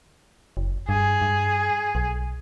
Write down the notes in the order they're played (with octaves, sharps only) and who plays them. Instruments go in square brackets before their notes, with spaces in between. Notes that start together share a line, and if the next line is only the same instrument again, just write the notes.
[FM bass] F#1
[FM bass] G2 [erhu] G#4
[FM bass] G2
B1